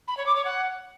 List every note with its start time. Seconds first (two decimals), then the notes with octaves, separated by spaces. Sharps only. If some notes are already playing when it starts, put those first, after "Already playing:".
0.08 B5
0.17 C#5
0.26 D6
0.36 C#5
0.45 F#5